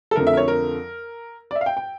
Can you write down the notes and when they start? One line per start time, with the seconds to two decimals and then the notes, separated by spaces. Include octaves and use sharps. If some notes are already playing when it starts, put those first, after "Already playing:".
0.11 A4
0.16 F2 D3 A3 A#4
0.27 E5
0.33 A#4
0.37 C#5
0.48 A#4
1.51 D5
1.55 E5
1.61 F5
1.66 G5
1.77 G5